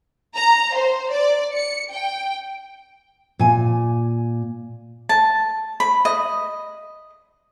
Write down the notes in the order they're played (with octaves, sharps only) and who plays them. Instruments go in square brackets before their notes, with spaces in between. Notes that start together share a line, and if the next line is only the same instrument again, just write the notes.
[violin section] A#5
C5
D5
C#7
G5
[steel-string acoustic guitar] A#2 G#5
[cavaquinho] A5
B5
D#5